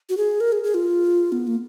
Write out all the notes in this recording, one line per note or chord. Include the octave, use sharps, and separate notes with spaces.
F#4
G#4
A#4
G#4
G#4
F4
B3
A#3